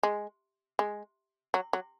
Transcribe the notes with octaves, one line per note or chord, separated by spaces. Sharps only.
G#3
G#3
F#3
F#3